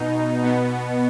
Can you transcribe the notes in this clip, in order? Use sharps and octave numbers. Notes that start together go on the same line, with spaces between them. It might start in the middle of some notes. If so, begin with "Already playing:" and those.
Already playing: B2 D#4
B2 B3